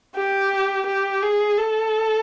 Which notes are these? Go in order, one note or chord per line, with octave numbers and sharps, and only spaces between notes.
G4
G4
G#4
A4